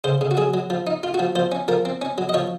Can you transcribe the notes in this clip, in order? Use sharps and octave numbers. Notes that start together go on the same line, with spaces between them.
C#3 C5
C#3
F#4
F#3 G#4
F#3
F3
D#4
F4
F#4
F3
F3 C5
C#4
F3 A#4
C4
C#4
F#3
D#5
F3 C#5